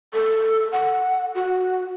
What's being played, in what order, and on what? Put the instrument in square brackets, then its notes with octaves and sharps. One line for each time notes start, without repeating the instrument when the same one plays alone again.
[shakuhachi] A4
F#5
F#4